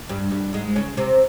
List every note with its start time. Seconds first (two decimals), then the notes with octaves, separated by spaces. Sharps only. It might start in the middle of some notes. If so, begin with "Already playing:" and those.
0.09 G2 G3
0.31 G2 G3
0.53 G#2 G#3
0.76 C#3 C#4
0.97 C3 C4